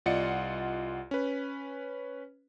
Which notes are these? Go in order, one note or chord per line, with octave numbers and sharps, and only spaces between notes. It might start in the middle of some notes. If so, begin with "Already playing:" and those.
C2 F4 D5 D#5 F#5 C#7
C#4 B4